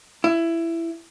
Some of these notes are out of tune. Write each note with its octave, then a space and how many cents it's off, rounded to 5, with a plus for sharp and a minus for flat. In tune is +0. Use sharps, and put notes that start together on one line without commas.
E4 +15